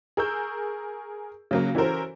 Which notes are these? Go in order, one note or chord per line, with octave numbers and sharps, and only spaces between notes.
G#4 A#4 C#6 E6 G6
C#3 F#3 A#3
E3 C#4 F#4 A4 A#4 C5